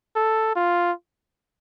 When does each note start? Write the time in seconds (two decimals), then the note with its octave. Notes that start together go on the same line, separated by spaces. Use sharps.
0.16 A4
0.56 F4